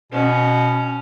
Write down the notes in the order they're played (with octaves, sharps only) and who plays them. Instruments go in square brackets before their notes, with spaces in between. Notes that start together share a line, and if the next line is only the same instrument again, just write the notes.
[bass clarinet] B2 [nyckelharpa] C#4